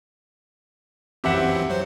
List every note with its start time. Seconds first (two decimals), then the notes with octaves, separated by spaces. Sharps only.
1.24 F#2 E3 C4 G4 E5 F#5
1.70 F#3 C5